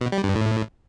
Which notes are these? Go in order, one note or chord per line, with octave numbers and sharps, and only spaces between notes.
B2
G3
G2
A2